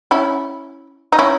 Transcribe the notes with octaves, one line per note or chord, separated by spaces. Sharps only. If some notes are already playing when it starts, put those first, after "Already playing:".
C#4 E4
D#4
C#4 E4